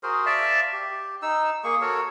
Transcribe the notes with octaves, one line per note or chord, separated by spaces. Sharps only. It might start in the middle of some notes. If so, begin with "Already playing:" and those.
F#4 G#4 A#4 C5
D5 E5 F5 A5
G4
D#4 E6
A#3 G#4 C#6
F#4 A4 A#4 C#5